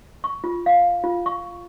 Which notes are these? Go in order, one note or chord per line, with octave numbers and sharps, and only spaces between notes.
C#6
F4
F5
F4
C#6